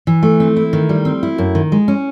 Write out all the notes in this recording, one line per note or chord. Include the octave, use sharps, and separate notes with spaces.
E3
A3
C4
E4
D#3
G3
C4
E4
F#2
D#3
G#3
C#4